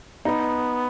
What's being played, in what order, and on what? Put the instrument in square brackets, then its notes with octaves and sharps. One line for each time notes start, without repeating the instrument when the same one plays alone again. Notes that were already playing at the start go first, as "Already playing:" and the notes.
[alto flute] B3 [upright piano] D#4